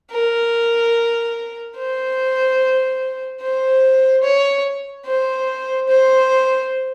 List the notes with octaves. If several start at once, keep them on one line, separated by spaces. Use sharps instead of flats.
A#4
C5
C5
C#5
C5
C5